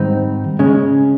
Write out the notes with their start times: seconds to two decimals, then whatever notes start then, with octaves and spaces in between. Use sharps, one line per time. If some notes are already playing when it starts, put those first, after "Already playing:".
Already playing: G#2 D#3 G3 C4 D#4
0.59 C#3 G#3 C#4